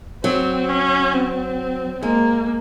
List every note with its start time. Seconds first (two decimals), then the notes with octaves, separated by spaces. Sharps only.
0.24 F#3 C4
0.69 C#4
1.14 C4
2.02 G#3 A#3